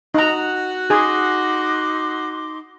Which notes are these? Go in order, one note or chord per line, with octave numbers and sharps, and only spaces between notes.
D#4 F#4 F#5 A#5
D#4 G#4 G#5 C6 D6